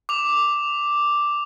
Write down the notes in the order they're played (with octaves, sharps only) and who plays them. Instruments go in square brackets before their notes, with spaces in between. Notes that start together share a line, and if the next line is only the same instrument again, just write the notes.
[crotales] D6 F7